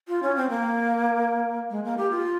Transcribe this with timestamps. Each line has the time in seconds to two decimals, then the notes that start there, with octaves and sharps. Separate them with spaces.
0.08 F4
0.23 C#4
0.36 C4
0.50 A#3
1.70 G#3
1.84 A#3
1.98 G4
2.11 F4